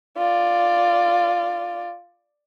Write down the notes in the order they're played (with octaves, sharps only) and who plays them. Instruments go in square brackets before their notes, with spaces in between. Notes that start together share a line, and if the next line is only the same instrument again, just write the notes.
[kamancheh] F4 D5